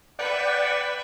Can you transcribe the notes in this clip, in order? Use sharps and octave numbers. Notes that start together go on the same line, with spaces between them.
B4 D5 E5 F#5 G5